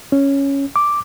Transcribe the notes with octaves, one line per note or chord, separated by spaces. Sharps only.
C#4
D6